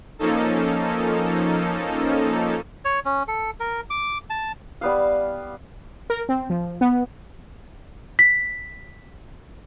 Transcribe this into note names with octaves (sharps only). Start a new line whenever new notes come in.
F3 A#3 C#4 D#4 A4
C#5
C#4
A4
A#4
D6
A5
G3 B3 F5
A#4
C4
F3
B3
B6